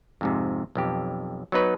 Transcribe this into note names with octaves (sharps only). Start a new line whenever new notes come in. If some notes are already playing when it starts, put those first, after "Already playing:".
F2 G#2 C3
B1 F2 G4
F#3 B3 D#4 B4 C#5